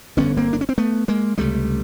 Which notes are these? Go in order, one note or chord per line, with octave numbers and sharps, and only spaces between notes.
G1 F2 D3 B3 C#4
A#3 C4
D4
C#4
C4
A3 B3
G#3 A#3
C#2 C3 G3 A3